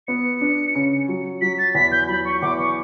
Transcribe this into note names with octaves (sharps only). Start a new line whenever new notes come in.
B3 C#7
D4
C#3
F#3
F#3 B6
A6
E2 B6
G6
F#3 B5
C#6
E2 D6
C#6